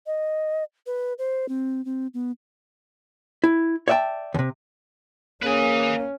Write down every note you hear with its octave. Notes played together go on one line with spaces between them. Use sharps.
D#5
B4
C5
C4
C4
B3
E4
C#5 D5 E5 F#5 G5 A5
D#2 C3
A#3 C#4 G#4 B4 G#5